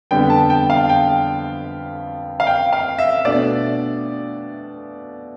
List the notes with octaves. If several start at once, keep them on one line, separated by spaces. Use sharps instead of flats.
F2 D3 G3 B3 G5
A5
G5
F5
G5
F5
G5
F5
E5
B2 A3 D4 D5